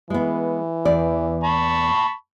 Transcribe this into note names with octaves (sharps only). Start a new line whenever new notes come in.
E3 G#3 B3
E2 D5
A5 B5 C#6